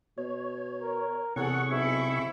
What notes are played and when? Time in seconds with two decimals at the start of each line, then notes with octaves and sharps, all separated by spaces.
0.18 B2 C#5
0.82 A#4
1.36 E2 C3 G#4 A4 C#5 F#5 C#6
1.70 B1 G#2 C4 E4